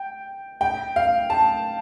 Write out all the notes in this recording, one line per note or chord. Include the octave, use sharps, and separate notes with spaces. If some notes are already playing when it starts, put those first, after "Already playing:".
Already playing: G5
G5
F5
A5